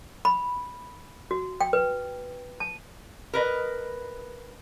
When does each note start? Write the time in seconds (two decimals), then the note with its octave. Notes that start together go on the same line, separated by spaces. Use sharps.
0.25 B5
1.31 F#4
1.61 G5
1.73 B4
2.60 A5
3.33 A#4 B4 D#5